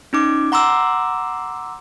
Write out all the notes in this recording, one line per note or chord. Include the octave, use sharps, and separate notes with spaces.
C#4 D#4 D6
F#5 A#5 C6 D6 E6